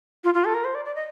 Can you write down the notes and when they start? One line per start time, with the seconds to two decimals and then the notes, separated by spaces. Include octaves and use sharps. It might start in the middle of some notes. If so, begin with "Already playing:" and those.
0.24 F4
0.34 F4
0.45 A4
0.54 A#4
0.65 C5
0.75 D5
0.85 D5
0.95 D#5